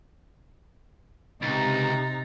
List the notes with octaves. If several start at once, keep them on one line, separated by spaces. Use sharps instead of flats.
C#2 C3 D#4 A#5 A6